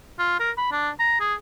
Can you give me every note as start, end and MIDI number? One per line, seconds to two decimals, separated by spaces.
0.19 0.35 65
0.40 0.51 70
0.58 0.72 83
0.72 0.90 62
0.99 1.17 82
1.20 1.34 68